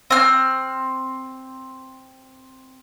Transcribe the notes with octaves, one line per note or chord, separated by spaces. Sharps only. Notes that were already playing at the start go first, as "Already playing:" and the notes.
C4 F6